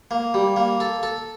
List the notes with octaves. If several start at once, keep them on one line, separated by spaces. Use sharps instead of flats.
A#3
G3
A#3
A4
A4